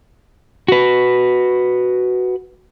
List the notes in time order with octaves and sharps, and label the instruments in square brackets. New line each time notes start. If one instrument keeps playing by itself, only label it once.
[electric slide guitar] F#4 B4